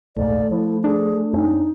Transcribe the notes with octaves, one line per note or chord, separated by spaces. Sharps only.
A#1 D#2 G#2 A3 D5
F3 E4
D4 G#4
F#2 C4 C#4 D#4